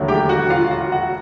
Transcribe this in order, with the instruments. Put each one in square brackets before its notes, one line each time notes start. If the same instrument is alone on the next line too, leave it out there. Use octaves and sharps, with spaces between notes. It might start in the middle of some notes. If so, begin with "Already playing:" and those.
Already playing: [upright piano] E1 D#2 D3 F#3 A3
G4 G5
F#4 F#5
F4 F5
F#4 F#5
F#4 F#5